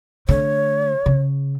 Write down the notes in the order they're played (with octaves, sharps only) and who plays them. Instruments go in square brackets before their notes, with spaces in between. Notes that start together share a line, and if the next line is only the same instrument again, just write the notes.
[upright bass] D3 A3 [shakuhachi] C#5
[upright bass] C#3